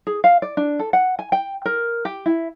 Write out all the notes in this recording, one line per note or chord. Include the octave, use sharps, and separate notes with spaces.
G#4
F5
D5
D4
A4
F#5
G#5
G5
A#4
G4
E4